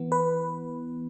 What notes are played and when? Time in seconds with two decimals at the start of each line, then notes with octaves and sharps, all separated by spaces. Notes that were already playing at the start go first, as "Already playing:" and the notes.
Already playing: E3 B3
0.12 B4